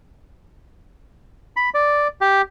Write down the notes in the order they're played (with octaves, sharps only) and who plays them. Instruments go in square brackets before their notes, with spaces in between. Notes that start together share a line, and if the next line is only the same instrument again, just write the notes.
[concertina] B5
D5
G4